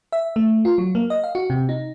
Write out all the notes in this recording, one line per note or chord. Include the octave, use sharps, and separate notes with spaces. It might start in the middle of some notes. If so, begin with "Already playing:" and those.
E5
A3
F4
F#3
A#3
D#5
F5
F#4
C3
D#4